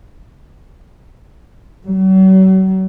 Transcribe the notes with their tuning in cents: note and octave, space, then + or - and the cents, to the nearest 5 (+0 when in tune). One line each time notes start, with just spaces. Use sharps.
F#3 +40